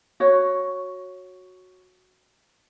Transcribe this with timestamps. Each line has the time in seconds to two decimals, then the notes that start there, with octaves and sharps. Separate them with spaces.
0.20 F#4 C#5